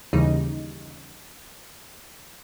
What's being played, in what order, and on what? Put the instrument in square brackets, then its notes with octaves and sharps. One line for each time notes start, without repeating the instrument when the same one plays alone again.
[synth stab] D#2 C#3 E3 G3 D#4